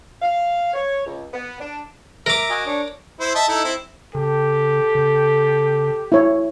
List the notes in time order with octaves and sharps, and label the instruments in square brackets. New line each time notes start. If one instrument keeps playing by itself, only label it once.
[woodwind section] F5
C#5
C#2
B3
D4
[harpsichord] A#4 D6 [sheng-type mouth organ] E5 A#5
[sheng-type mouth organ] F#4 D#5 G#5
D4 C#5
[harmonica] E4 C5
D#5 E5 A5
D#4 E4 A4
C4 E4
[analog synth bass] C#3 [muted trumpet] G4 [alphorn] A4
[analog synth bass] C#3
[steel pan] E4 C#5